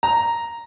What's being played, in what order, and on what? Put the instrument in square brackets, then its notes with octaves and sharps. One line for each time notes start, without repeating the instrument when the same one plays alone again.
[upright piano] A#5